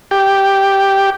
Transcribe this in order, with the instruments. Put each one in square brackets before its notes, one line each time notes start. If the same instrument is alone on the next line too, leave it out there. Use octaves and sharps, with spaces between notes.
[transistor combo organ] G4